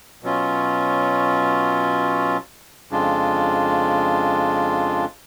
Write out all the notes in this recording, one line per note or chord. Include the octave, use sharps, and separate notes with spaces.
B2 F#3 C#4 F4
F2 C#3 G#3 D4 F4